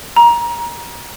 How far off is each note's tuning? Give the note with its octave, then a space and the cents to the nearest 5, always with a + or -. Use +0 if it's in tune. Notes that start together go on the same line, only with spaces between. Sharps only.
A#5 +25